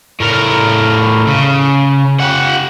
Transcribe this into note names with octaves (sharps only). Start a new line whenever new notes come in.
A2 A#4
C#3
G4 F#5